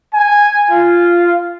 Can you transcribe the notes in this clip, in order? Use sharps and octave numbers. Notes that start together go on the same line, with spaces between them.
G#5
F4